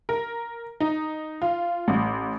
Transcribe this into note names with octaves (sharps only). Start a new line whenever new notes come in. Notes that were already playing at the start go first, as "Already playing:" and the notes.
A#4
D#4
F4
A1